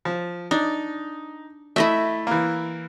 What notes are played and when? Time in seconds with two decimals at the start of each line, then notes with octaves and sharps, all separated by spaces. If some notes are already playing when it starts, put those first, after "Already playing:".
0.05 F3
0.51 D4 D#4
1.76 A3 E4 D#5 E5
2.27 E3 A#3